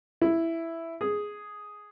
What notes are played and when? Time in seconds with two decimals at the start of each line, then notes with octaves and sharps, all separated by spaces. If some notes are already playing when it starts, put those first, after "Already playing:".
0.22 E4
1.01 G#4